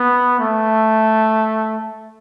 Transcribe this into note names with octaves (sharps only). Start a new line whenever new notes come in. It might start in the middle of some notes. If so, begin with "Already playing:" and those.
Already playing: B3
A3